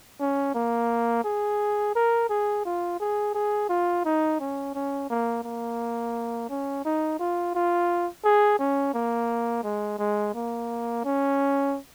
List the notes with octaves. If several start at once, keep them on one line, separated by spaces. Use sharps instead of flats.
C#4
A#3
G#4
A#4
G#4
F4
G#4
G#4
F4
D#4
C#4
C#4
A#3
A#3
C#4
D#4
F4
F4
G#4
C#4
A#3
G#3
G#3
A#3
C#4